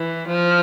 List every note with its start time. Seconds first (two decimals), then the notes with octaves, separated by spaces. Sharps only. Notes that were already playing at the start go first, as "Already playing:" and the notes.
Already playing: E3
0.28 F3